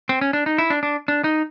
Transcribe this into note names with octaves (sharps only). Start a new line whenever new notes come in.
C4
C#4
D4
D#4
E4
D4
D4
D4
D#4